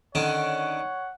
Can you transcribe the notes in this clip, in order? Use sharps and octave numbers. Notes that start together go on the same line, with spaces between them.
D3 D#3 C#4 C#5 F#5